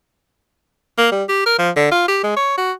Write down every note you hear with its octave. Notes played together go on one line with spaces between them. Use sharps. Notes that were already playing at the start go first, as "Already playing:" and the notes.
A#3
G3
G4
A#4
F3
D3
F4
G4
G#3
C#5
F#4